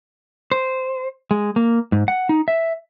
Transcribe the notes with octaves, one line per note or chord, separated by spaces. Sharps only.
C5
G#3
A#3
G#2
F#5
D#4
E5